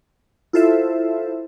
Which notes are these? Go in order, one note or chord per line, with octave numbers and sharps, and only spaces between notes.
E4 F4 A4 C5 E5